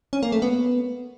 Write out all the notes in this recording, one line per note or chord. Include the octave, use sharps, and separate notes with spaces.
C#4
A#3
A3
B3